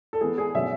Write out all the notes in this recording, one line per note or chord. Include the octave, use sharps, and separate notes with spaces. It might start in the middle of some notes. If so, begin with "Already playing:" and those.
A4
E3 B3 G#4
G#4
B2 F#3 C#4 E5